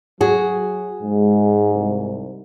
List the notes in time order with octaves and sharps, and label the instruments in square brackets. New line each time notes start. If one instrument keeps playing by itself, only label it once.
[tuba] F#3 [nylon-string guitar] F#4 G#4
[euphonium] G#2 [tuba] G#3
[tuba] C2